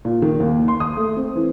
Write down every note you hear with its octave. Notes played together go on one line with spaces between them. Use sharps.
A#2
D#3
D#2
C6
D#6
A3
C4
E3